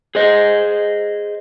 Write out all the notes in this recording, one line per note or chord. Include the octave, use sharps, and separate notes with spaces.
G#4 C5 D#5